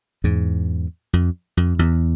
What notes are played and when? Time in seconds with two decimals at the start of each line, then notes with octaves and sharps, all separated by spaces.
0.24 E2 G#2
1.13 F2
1.57 F2
1.79 E2